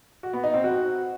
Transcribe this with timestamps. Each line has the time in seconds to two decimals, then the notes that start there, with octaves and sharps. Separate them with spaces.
0.23 F#4
0.33 B3
0.44 D#4
0.54 C4
0.64 F#4